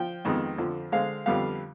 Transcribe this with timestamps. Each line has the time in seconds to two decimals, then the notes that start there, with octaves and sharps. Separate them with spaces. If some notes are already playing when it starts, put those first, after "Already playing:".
Already playing: F3 G5
0.25 F2 D#3 G#3 B3
0.58 F2 D3 F3
0.92 D3 G#3 C4 F5
1.26 F2 D3 G3 B3 F5